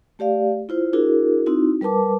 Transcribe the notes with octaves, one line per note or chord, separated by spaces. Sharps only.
A3 G4 D5 F5
E4 F4 C5
D4 E4 F#4 G#4 A#4
C4 D#4 E4 F#4
G3 A#4 B4 A5 D6